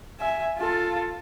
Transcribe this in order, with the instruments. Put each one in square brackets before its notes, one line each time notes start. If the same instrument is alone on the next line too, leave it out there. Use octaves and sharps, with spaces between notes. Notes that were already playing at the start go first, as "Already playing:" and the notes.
[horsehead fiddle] E5 G#5
F4 A4